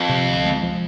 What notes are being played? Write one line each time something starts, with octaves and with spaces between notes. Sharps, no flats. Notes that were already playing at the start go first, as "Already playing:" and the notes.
Already playing: F2
C3
D2
G#3
F3